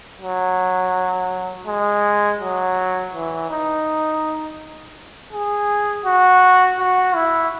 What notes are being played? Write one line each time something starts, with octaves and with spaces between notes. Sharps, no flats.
F#3
G#3
F#3
E3
D#4
G#4
F#4
F#4
E4